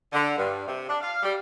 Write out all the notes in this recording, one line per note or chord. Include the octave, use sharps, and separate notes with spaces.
D3
G2
C3
D4
F5
G3